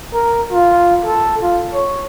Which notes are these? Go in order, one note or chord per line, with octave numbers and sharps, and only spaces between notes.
A#4
F4
A4
F4
C#5